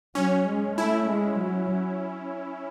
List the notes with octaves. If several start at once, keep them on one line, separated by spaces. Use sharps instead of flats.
F#3 C#4
G#3
A3 E4
G#3
F#3